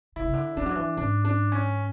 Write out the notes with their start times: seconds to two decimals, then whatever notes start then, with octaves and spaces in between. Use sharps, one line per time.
0.16 D3 E4
0.24 C#3
0.33 D3
0.57 E3 D4
0.66 F#3
0.75 E3
0.97 G#2 D4
1.25 D4
1.52 C#4